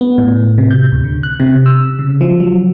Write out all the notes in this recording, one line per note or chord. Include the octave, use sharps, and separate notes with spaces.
B3
A2
C3
G6
D2
D3
F#6
C3
E6
C#3
F3
F#3